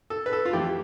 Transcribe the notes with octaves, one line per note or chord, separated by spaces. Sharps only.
A4
B4
A4
F4
F2 E3 A3 G4